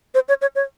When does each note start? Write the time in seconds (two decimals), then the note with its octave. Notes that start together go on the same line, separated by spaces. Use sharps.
0.14 C5
0.28 C#5
0.41 C#5
0.55 C#5